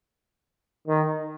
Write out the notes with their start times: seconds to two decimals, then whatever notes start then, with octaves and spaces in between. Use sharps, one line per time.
0.88 D#3